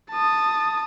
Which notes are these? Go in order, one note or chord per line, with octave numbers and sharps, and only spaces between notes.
A5 D#6